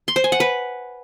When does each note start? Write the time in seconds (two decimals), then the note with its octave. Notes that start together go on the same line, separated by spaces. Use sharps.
0.08 C6
0.16 C5
0.24 G#5
0.32 F#5
0.40 B4